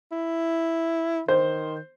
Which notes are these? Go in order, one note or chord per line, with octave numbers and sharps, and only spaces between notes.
E4
D#3 C5